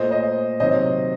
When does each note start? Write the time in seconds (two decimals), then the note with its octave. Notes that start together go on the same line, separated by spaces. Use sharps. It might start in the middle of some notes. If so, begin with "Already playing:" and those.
Already playing: A#2 A3 C5 D#5
0.11 C5 D#5
0.60 C3 D#3 F#3 C5 D#5